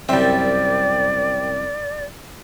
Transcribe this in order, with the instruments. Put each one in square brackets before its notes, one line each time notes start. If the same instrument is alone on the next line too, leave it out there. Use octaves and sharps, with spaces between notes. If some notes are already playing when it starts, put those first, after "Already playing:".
[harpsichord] C2 F#2 E5 [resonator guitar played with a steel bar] G3 C4 [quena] D5